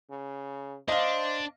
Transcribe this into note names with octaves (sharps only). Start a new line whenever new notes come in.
C#3
D4 C5 D#5 F5